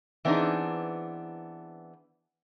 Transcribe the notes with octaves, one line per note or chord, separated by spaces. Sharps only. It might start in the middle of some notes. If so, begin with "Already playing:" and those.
E3 B3 C4 D4 D#4 G#4